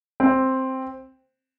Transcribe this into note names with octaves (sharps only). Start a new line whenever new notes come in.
C4